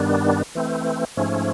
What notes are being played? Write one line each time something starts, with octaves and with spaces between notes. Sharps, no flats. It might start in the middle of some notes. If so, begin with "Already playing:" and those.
Already playing: G2 D#3 G3 B3 D4
E3 A3 C4
G#2 F3 A3 C#4